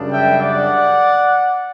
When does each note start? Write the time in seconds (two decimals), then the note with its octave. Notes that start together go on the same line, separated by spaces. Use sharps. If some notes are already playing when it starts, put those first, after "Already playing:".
Already playing: F#2 C#3 G3 D4
0.12 E5 G5
0.40 D5 F#5